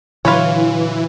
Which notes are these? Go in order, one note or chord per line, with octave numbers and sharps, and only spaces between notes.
A#2 D3 E3 F#3 F4 B4 C#5